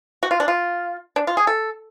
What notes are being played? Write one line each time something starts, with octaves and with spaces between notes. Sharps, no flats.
F#4
F4
D4
F4
D4
F4
G#4
A4